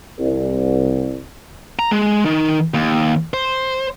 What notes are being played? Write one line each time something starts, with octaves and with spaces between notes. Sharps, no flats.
C2
A#5
G#3
D#3
D#2
C5